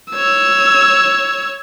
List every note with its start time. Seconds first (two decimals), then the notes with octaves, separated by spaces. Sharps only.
0.11 C#5 E6